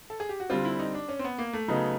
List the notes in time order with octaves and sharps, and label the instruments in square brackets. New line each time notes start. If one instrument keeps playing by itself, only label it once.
[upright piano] A4
G#4
G4
F#4
[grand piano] D3 G3 C4 [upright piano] F4
[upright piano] E4
D#4
D4
C#4
C4
B3
A#3
A3
[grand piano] C#3 F#3 B3 D#4